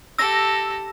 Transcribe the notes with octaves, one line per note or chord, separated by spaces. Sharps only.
G4 A4 E6 A#6